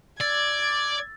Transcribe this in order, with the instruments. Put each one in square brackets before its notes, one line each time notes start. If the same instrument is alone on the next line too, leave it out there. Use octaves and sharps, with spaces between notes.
[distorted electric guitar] D5 [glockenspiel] E6 A6 [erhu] G#6